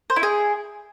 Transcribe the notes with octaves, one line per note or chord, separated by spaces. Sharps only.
C5
E4
G#4